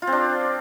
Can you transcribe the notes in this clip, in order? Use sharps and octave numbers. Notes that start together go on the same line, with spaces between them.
F4
C4
D4